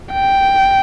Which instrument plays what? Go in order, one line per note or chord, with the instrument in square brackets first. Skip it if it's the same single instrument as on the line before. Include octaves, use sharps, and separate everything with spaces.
[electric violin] G5